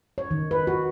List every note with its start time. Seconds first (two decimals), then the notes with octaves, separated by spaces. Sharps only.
0.18 C#5
0.31 D#3
0.51 B4
0.67 F#4